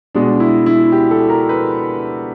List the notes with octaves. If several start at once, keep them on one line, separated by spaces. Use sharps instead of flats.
B2 G#3 D4
E4
E4
G4
A4
A#4
B4